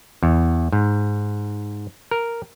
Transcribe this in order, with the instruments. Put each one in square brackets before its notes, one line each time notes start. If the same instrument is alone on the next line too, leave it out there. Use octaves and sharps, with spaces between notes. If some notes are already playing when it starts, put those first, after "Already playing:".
[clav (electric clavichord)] E2
G#2
A#4